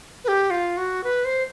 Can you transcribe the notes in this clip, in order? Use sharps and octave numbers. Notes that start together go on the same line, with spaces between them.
B4
G4
F4
F#4
B4
C5